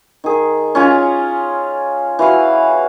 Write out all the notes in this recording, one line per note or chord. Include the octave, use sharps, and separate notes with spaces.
D#3 G#4
C#4 F4 G#5
E3 F#4 F5